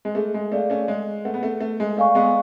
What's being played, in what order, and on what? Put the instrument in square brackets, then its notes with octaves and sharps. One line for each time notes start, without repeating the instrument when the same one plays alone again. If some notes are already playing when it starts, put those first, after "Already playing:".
[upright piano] G#3
[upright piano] A3 [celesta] G#4
[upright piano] G#3
[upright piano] A3 [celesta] D5 F5
[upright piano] A3 C#4
[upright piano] G#3 [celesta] G#4
[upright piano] A3 [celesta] B4 F#5
[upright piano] B3
A3
[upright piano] A3 [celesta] B4
[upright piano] G#3
[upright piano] A3 [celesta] D5 F5 G#5 C#6
[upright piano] G#3 B3